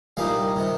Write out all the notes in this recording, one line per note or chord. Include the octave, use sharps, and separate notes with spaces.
C2 A#2 G3 D#4 F5
C3 D#3